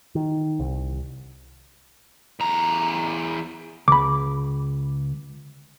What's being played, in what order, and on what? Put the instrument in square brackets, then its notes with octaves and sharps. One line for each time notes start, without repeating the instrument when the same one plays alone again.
[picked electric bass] D#3
C2
[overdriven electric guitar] E2 A#5
[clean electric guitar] C#2 [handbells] B5 D6